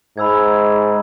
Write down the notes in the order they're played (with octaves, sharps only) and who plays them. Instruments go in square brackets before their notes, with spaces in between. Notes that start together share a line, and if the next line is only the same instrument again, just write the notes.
[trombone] G#2 [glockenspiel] B5 E6 G#6